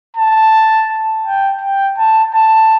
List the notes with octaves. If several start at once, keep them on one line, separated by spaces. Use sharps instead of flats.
A5
G5
G5
A5
A5